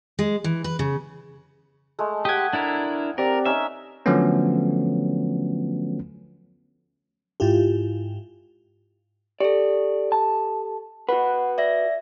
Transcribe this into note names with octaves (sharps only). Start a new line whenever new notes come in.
G#3
E3
B4
C#3
G#3 A3
G4 F#5 G5 D#6 G#6
D4 E4 A#4
C4 G4 A#4 D5
C#4 D#4 E5
D3 F3 F#3 A3 B3 C#4
G#2 E4 F4 G4
G4 A4 D5
A5
F#4 B4 F#5
D5 E5 A#6